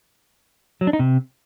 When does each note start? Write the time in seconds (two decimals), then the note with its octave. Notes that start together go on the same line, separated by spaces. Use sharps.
0.81 F#3
0.87 D4
0.93 D#4
0.99 C3